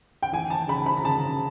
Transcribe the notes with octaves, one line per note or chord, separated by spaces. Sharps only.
G5
E3 G#5
A5
C#3 B5
B5
A#5
C#3 A5